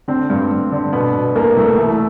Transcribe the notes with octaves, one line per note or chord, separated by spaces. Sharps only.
D3 C4
G2
G2
D3
B2 B3
B2
C2 A#3
C2 A3
E3 A3